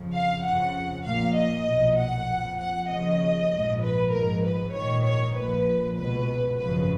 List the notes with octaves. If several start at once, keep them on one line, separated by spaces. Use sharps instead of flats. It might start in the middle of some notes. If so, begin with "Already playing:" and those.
Already playing: F2 C#3 F3
F5
F2 C#3 F3 F#5
A#1 A#2 F3 F5
D#5
B1 A#2 F3
F#5
F2 F3
F#5
D#2 C#3 F3 D#5
A#1 G#2 F3
B4
G#1 G#2 F3 A#4
B4
A#1 G#2 D#3 C#5
C#5
A#1 A#2 F3 B4
C#2 B2 B4
G#1 F#2 C#3 F3 B4